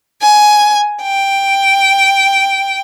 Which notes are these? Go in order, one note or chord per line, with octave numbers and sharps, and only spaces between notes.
G#5
G5